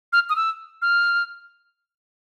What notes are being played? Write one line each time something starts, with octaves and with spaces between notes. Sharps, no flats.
F6
D#6
E6
F6